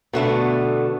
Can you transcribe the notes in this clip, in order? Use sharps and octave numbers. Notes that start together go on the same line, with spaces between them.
B2 D3 A3 B3